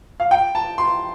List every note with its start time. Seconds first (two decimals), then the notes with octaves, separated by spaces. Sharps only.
0.20 F5
0.31 G5
0.55 A5
0.78 C6